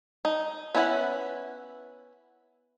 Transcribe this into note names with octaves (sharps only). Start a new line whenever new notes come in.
D#4
B3 C#4 E4 G#4 F#5